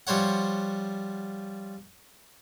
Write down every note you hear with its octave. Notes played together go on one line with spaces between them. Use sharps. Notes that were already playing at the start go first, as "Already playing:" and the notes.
F3 G3 C5 C#5 F#5